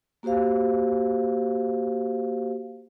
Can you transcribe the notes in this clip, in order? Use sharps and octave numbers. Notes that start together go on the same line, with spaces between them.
A#3 F#4 G4 C5 F5